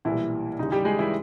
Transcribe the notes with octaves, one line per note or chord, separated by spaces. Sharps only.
B1 A#2 E3 G3 E4
D#2 C#3 E3 G3 D#4
G3 G4
G#3 G#4
E3 E4